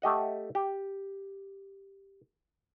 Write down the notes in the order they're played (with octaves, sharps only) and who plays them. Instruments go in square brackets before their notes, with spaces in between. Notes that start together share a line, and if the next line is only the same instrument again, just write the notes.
[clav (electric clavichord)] A3 G4 D#5 F#5
G4